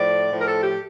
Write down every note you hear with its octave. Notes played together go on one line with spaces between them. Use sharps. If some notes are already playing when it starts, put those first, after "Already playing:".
Already playing: A2 F3 D5
A2 F3
A#4
A4
G4